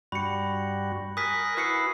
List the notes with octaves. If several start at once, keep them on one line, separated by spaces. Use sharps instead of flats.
G2 G3 F#4 B5 C#7
A#4 G#5 D#6 F#6 B6
E4 F#4 B4 D#6 C7 C#7